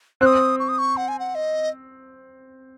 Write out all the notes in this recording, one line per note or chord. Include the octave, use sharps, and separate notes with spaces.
C4 D#6 F#6
C#6
D#6
C#6
F#5
G#5
F#5
D#5